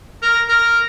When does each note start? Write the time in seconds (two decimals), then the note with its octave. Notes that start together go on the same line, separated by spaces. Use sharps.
0.22 A#4
0.48 A#4